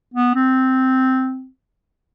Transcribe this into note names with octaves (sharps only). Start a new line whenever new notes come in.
B3
C4